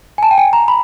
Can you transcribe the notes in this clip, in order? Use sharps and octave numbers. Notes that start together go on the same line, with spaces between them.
G#5
A5
G5
G#5
A#5
B5